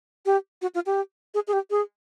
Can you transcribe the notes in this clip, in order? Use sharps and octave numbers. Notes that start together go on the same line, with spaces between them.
G4
F#4
F4
G4
G#4
G#4
G4
G#4